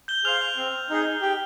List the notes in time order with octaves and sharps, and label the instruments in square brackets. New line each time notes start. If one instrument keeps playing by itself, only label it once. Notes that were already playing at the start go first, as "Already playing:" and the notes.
[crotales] G6 G7
[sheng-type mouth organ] G#4 C5 F5 [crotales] F6 F7
[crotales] F6 F7
[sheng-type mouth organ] C4
D#4 G#4
G4